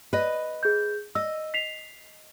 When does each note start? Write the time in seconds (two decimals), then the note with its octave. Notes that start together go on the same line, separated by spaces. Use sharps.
0.13 B4 D#5
0.63 G#4 G6
1.15 D#5 E6
1.54 B6 C7 F7